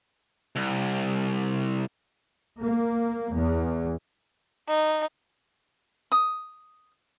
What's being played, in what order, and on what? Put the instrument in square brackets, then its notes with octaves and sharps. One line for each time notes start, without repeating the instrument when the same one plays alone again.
[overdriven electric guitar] C2
[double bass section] A#3
E2
[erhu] D#4
[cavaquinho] D#6